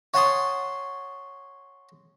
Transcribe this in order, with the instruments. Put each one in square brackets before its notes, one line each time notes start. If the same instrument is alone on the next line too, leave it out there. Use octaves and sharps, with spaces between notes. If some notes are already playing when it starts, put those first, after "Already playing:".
[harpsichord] C#5 F#5 G#5 A5 C6 D#6